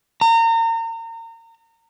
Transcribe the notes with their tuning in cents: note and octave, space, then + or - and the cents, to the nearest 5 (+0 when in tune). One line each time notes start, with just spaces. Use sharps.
A#5 -35